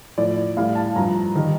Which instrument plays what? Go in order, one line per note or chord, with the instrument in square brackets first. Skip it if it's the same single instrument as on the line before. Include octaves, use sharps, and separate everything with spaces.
[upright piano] A2 F3 D5
A2 G3 F5
A5
G2 F3 A#5
D#3 G3